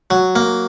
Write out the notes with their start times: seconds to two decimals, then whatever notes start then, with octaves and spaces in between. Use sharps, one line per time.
0.10 F#3
0.36 A#3